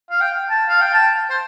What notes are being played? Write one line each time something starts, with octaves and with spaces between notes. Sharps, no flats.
F5
G5
A5
F5
G5
A5
C5